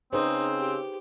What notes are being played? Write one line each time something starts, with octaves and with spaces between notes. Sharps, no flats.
C#3 C4 D#4 G#4 B4 C5
G4